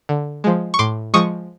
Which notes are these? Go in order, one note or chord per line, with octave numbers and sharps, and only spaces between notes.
D3
F3 G#3
C#6
A2 C6 D6
F3 G#3 C#6 D#6